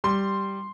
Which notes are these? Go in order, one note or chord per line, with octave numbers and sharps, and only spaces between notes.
G3 C6